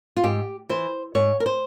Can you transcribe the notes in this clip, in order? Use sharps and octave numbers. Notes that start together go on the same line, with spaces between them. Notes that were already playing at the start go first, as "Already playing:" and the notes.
F4
G#2 G4
E3 C5
G#2 C#5
A#4
C5